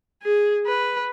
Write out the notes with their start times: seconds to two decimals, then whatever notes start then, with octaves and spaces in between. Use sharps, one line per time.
0.23 G#4
0.66 B4